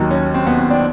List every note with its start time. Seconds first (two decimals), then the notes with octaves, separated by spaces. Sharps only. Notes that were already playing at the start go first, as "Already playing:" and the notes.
Already playing: D#2 D#3 F#3
0.11 C#4
0.34 C4
0.47 B3
0.59 C4
0.70 D4